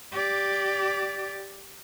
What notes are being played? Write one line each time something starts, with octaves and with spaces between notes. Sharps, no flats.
G4 D5